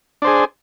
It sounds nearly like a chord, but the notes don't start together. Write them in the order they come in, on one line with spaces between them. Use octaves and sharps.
D4 C5 G#4